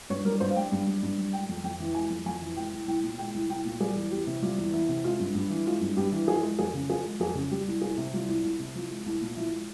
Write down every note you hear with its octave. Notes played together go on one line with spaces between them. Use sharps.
G2 C#5
G3 A#4
G2 C5
F5
G3 G5
G2
G3
G2
G3
G#3 G5
F2
F2 G5
E3
G#3 G#5
F2
F2 G#5
E3
G#3 G5
C2
C2 G5
A#2
G#3 G5
C2
C2 G5
A#2
G3 G#4
E2
E2 G4
C3
G3 F4
E2
E2 E4
C3
G#3 F4
G2
G2
E3
G#3 F4
G2
G2 G4
E3
F3 G#4
G#3
F2 G#4
C#3
F3 G#4
G#3
F2 G#4
C#3
G3 G4
C2
C2 G#4
C3
G3 F4
C2
C2
C3
F3
G#3
C2
A#2
F3 E4
G#3